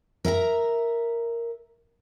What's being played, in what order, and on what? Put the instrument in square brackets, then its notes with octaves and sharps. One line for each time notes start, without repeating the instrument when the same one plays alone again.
[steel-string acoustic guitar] A#4 E5 F#5 A#5